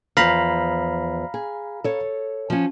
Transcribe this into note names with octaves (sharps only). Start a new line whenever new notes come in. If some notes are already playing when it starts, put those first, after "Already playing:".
E2 F3 C5 F5 A#5 B5
G#4
A4 C#5
F3 C#4